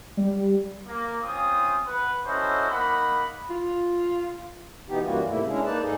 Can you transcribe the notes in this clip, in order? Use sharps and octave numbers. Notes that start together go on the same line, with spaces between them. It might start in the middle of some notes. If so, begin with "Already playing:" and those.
G3
A#3
C4 C#4 F4 G#5 D#6
B4 F#5
C#4 E4 F#4 A4 C5 D#5
A#3 D#4 F#5 B5
F4
B2 E3 B3 D#4 G4
F#2 E3 G3 A#3 F4 F#4
G#2 C3 A3 A#3 E4
G#3 C#4 D4 E4 G#4
A#3 D#4 B4 D5 A5
G#2 D#4 G#4 A4